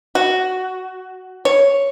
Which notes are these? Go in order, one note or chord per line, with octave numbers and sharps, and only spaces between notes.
F#4
C#5